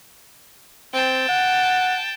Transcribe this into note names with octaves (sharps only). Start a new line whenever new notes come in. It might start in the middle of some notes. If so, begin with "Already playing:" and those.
C4 G5 A5
F#5